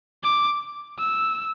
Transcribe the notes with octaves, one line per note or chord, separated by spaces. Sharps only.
D6
E6